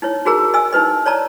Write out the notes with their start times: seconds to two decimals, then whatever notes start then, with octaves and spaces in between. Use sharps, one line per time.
0.02 D#4 E4 C#5
0.25 D#4 F#4 G#4 A#4 A#5
0.54 D#5 G#5 E6
0.73 D#4 E4 B4 D#5
1.06 C#5 D5 A5 A#5